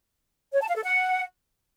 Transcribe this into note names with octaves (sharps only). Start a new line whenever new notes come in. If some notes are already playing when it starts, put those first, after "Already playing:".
C#5
A5
F5
A4
F#5